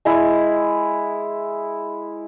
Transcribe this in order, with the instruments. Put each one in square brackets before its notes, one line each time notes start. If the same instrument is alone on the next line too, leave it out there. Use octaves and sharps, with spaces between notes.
[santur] G#3 E4